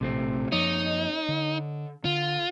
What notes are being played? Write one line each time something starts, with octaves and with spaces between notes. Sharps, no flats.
A#1 A2 C3 A3 C4
F#2 F3 A#3 D#4 C#5 D#5
D3
D3 F4